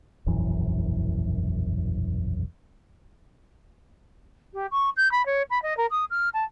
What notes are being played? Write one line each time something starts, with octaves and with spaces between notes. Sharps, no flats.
E1 A#1 F#2 E3
G4
C#6
G6
B5
C#5
B5
D#5
A#4
D#6
F6
A5